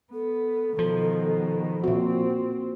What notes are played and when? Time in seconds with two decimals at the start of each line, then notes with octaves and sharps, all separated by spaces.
0.13 B3 A4
0.79 B2 D#3 F3
1.84 A#2 C4 F#4